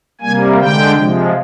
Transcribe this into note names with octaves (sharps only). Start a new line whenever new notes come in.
C3 G3 A#3 G#5
D3 G#3 G5
C3 F3 G#3